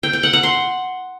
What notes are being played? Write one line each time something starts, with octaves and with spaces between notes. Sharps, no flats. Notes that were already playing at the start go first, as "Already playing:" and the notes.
G5
G5
F#5
F#5
C6